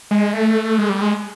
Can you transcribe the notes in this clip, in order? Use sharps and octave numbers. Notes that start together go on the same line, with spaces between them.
G#3
A3
G#3
G3
G#3